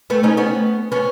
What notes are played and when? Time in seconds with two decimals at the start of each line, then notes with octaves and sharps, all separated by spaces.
0.10 A3 B3
0.23 C#4 D#4
0.37 B3 C#4
0.92 B3 C#4